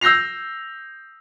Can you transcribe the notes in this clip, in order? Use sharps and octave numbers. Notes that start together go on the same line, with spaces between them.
E6 G6 A#6 C7 F7